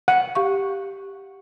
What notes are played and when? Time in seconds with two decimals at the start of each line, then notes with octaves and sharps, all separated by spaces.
0.08 F#5
0.35 G4 F5 C#6